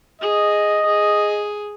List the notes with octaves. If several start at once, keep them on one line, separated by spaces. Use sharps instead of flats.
G#4 D#5
G#4